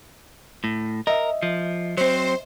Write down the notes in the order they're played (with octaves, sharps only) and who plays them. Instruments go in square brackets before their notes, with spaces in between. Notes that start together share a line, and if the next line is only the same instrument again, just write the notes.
[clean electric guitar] A2
[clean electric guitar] A#4 [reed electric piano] D#5 E5
[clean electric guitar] F3
[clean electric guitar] F#3 C4 [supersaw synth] C5